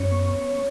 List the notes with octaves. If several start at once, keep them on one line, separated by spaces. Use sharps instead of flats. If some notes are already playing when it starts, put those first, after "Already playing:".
Already playing: F#2 C#4 C#5
B3